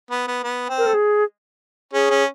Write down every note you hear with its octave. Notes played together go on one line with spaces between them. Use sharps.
B3
B3
B3
C4
A#4
A4
G#4
C#4 G#4
C#4